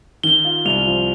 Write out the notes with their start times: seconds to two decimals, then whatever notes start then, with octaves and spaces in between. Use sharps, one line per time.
0.23 D#3 G7
0.45 F4
0.65 C2 F7
0.87 F3